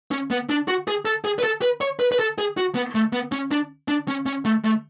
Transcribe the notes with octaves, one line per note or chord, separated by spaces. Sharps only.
C#4
B3
D4
F#4
G#4
A4
G#4
B4
A4
B4
C#5
B4
B4
A4
G#4
F#4
B3
A3
B3
C#4
D4
D4
C#4
C#4
A3
A3